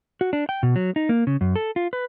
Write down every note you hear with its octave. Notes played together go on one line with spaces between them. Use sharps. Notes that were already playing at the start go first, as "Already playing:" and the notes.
F#4
D4
G5
B2
F#3
D#4
A#3
C#3
F#2
A4
F4
B4